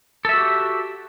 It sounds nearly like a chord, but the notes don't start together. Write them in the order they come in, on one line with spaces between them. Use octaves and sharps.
A4 E5 F#4 G4